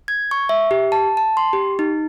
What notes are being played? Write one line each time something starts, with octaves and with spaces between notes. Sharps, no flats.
G#6
C#6
E5
G4
A5
A5
C6
G4
D#4